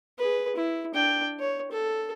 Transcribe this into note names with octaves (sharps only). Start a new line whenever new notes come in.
G#4 B4
E4
D4 G5
C#5
A4